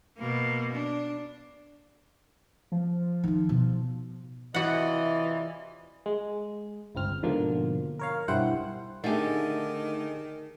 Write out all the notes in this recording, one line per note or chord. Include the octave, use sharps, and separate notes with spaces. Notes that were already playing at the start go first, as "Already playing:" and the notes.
B2 A#3
D4
F3
D#3 D#4
B2
C3 E3 F4 F#4 D5 D#5 F#5
G#3
G1 C#2 C4 F6
G#2 B2 D3 F3 A#3
A#4 C#5 F5
B1 G2 E4 C5 F#5 G5
D3 D#3 A3 D#4 G4 G#4 G#5